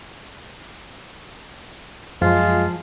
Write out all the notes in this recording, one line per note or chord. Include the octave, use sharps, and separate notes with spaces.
F#2 F3 G#3 F4